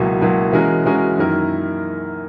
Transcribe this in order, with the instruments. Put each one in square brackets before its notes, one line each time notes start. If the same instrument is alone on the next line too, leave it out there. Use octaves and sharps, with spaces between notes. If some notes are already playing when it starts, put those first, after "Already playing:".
Already playing: [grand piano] C#2 B2 F#3 A#3 E4
C#2 B2 F#3 A#3 E4
E3 G#3 C#4 F#4 A#4
E3 G#3 C#4 F#4 A#4
F#2 D#3 A#3 E4 A#4